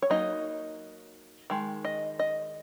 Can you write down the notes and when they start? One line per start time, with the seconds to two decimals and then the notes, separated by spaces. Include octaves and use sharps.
0.02 C#5
0.10 F#3 A#3 D#4 D#5
1.50 D#3 G#3
1.85 D#5
2.19 D#5